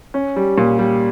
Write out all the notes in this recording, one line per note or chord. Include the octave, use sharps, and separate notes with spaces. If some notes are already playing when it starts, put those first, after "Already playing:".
C#4
G3
A#2
G3